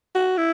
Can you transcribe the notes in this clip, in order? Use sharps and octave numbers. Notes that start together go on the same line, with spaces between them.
F#4
E4